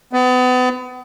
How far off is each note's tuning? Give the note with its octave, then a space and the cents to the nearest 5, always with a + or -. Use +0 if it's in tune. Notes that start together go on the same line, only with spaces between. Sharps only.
B3 +35